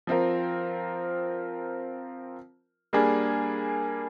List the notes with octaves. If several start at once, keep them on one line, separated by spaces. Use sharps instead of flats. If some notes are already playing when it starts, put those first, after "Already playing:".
F3 C4 F4 A#4
G3 A#3 D4 G#4